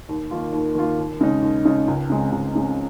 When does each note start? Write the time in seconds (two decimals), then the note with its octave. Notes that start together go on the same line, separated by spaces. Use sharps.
0.09 D#2
0.31 D#3 A#3 F4
0.53 D#2
0.75 D#3 A#3 F4
0.99 D#2
1.21 C#3 G#3 D#4
1.42 D#2
1.65 C#3 G#3 D#4
1.88 C#2
2.10 C#3 G#3 C4
2.32 C#2
2.55 C#3 G#3 C4